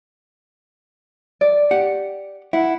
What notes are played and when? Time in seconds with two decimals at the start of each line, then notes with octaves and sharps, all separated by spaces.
1.41 D5
1.71 G4 F#5
2.53 E4 F#5